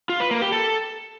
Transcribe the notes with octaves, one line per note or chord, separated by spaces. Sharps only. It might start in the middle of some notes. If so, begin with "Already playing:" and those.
F4
B4
A#3
G4
A4